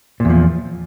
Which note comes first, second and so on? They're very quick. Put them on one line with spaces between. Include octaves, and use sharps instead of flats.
A#2 E2 F3